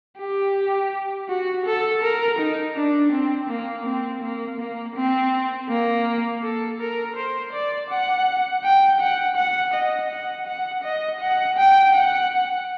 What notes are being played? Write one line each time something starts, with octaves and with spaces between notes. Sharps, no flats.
G4
F#4
A4
A#4
D#4
D4
C4
A#3
C4
A#3
A#3
C4
A#3
A4
A#4
C5
D5
F#5
G5
F#5
F#5
D#5
F#5
F#5
D#5
F#5
G5
F#5